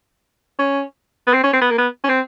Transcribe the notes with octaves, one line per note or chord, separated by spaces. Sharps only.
C#4
B3
C4
C#4
C4
B3
A#3
B3
C#4
C4